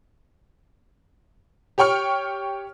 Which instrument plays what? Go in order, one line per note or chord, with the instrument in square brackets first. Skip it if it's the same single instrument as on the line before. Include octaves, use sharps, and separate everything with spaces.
[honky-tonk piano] G4 C#5 G5 C#6 F6